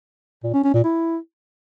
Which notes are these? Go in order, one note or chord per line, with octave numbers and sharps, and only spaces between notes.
A#2
C#4
C#4
A#2
E4